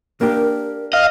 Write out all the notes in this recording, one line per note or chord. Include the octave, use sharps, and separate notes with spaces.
A#3 D4 G4 A#4
D#5 F5